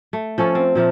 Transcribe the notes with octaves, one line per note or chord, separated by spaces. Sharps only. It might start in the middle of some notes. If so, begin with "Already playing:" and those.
A3
F3 C#4 A4 C#5
C4
A#2 F3 A3 A#4